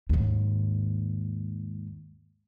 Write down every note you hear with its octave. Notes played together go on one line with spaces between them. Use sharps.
D#2 G#2